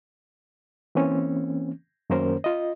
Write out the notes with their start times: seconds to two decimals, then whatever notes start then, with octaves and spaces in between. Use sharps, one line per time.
0.95 E3 A#3 C4 C#4
2.10 F#2 D#3 A#3 C#4 A#4 C5
2.44 F4 D#5